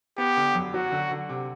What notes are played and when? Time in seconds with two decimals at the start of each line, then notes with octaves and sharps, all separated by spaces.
0.18 B3 G4
0.37 D3
0.55 F#2
0.73 F#3 F#4
0.92 D3
1.11 D3
1.29 C3